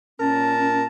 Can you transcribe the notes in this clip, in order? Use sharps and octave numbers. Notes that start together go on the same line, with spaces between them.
A#2 C#4 A#4 A5